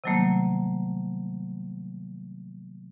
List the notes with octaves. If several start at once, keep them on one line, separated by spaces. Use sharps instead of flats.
C3 D#3 F#3 G3 A3 A#3